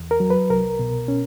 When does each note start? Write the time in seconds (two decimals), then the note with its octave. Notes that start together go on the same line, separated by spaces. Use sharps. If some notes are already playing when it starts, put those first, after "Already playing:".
Already playing: E2
0.11 A#4
0.20 F#3
0.30 B4
0.50 C2 A#4
0.79 B2
1.08 C#4